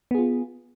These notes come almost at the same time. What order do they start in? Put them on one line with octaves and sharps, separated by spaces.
B3 G#4 F4